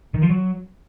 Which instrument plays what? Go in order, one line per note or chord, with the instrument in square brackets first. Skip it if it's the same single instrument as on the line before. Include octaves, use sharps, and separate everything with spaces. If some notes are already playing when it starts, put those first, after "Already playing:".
[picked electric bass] D#3
F3
F#3